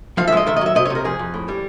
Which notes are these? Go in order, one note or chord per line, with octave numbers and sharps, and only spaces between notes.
F3 F5
E5
G#3 D#5
D#3 E5
D#5
F#3 E5
C3 D#5
C#5
C3
A#4
F2 G#4
F2
A2
G3